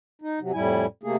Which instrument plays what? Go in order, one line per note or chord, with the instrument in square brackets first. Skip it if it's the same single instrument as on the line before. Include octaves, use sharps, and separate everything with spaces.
[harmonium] D#4
C3 F#3
F2 A2 G3 E4 G#5
C3 A3 A#3 G#4